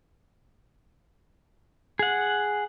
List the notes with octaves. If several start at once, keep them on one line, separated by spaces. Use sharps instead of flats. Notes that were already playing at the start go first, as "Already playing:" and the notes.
G#4 F#5